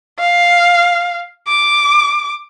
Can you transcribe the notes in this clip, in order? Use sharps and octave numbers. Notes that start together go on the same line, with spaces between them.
F5
D6